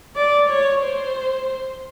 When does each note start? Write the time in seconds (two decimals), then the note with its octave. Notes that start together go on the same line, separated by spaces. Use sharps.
0.16 D5
0.49 C#5
0.82 C5